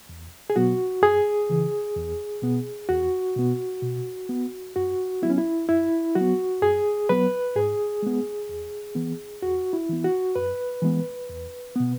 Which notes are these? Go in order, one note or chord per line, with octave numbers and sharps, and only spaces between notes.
E2
G#4
B2 F#3 B3 F#4
F#2 G#4
C#3 E3
E2
B2 B3
E2 F#4
B2 B3
B2
B3
F#2 F#4
F#3 B3 E4
C#4
E4
F#2 E4
F#3 F#4
B3
F#2 G#4
F#3 B3 B4
G#2 G#4
G#3 B3
E2
E3 B3
E2 F#4
E4
E3 B3
F#4
F#2 B4
E3 G#3 B3
E2
B2 B3